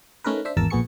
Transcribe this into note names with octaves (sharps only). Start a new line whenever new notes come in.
A3 C#4 D#4 A#4 B4
D4 C5 E5
G#1 E2 A#4 A5 E6
A#1 A#2 B3 G#4 C#6 C#7